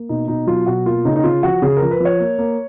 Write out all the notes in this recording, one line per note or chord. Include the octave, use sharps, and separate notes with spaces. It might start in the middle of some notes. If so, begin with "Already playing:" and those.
Already playing: A#3
B2 D#4
B2 D#4
F#3 F4
B2 F#4
A#3 F4
C#3 D#4
D#4
C#3 F4
F3 F#4
C#3 G#4
F3 A#4
B4
F3
C#5
A#3
A#3